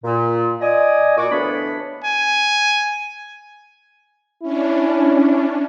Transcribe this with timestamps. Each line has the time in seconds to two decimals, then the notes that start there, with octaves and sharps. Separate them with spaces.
0.04 A#2
0.61 D5 D#5 G#5
1.17 A#2 F#4 D6
1.31 D2 E3 B3 D4 C#5 B5
2.04 G#5
4.43 C#4 D4 E4